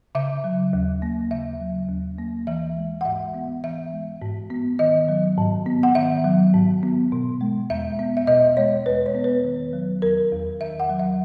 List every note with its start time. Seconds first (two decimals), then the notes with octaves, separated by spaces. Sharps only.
0.15 C#3 E5
0.44 F#3
0.73 D#2
1.02 A#3
1.31 C#3 E5
1.61 F#3
1.89 D#2
2.18 A#3
2.47 E3 E5
2.77 G#3
3.01 F#5
3.05 G#2 E5
3.34 B3
3.64 E3 E5
3.93 G#3
4.22 G#2
4.50 B3
4.79 D#3 D#5
5.09 F#3
5.38 G#2
5.66 B3
5.83 F#5
5.95 D#3 E5
6.24 F#3
6.54 G#2
6.83 B3
7.12 B2
7.41 G#3
7.70 E2 E5
7.99 B3
8.17 E5
8.27 B2 D#5
8.57 G#3 C#5
8.86 E2 B4
9.06 C#5
9.15 B3
9.24 B4
9.44 D#3
9.73 F#3
10.02 E2 A#4
10.32 E2
10.60 D#3 E5
10.80 F#5
10.89 F#3
10.99 E5